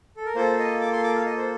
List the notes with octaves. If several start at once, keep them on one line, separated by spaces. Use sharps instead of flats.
A4
A#4
A#3 F4 A4 C5
D#5
D6
C6
D6
F5
D#5
C5